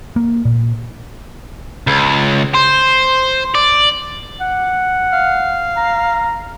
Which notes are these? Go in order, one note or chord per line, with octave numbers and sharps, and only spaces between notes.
A#3
A#2
C#2
C5
D5
F#5
F5
A#5